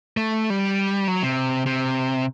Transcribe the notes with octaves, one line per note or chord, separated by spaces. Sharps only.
A3
G3
F#3
C3
C3